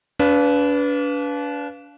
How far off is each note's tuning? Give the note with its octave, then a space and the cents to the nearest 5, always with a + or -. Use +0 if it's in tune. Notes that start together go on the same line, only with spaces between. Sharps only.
D4 -35 B4 +0 F5 +0